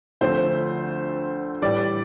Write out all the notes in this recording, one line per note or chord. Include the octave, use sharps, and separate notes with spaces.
D2 D3 F3 A3 C4 C5
A2 E3 G3 D5